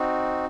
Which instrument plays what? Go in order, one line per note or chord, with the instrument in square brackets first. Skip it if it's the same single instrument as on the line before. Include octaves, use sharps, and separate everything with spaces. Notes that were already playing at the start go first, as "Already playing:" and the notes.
Already playing: [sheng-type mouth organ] C4 D#4 F#4